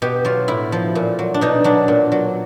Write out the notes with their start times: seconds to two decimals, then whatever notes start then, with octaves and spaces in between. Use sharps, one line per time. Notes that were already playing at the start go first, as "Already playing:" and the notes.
0.02 B2 G4
0.25 F#3 F4
0.48 A2 E4
0.72 F3
0.95 A#2
1.19 F#3
1.34 D4
1.41 B2 D#4
1.64 F#3 D4
1.88 A#2
2.12 F#3